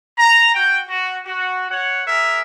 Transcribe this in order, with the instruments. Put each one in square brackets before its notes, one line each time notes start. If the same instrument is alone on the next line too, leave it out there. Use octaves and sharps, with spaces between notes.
[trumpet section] A#5
F#4 G5
F#4
F#4
C#5 F#5
G#4 A#4 E5